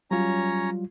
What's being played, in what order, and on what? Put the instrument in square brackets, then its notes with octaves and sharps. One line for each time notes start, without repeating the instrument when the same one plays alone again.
[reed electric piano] F#3 G3 F4 [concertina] C#4 C#5 A#5